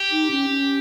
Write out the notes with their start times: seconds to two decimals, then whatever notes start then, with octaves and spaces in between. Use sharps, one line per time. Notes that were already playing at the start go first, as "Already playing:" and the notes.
Already playing: G4
0.12 D#4
0.31 C#4
0.50 C#4